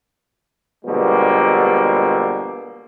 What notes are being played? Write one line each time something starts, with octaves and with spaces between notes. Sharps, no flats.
B2 D3 F3 G3 G#3 A#3